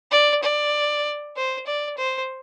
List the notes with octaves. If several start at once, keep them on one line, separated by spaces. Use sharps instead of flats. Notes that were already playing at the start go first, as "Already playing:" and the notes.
D5
D5
C5
D5
C5